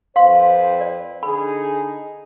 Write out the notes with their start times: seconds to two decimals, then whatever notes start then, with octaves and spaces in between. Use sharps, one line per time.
0.16 F2 B4 C5 F5 C6
0.81 D5
1.23 D3 D#4 G#4 B5